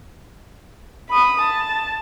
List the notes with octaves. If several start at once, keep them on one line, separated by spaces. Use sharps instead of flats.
B5 D#6
A5